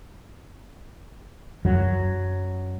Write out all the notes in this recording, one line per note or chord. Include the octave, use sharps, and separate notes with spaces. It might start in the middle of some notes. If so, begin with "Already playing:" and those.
F#2 F#3